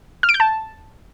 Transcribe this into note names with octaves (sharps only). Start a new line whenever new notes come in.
F6
D7
G6
A5